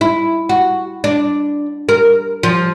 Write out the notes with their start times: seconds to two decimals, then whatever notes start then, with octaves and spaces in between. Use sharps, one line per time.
0.01 E4
0.49 F#4
1.04 D4
1.89 A#4
2.43 F3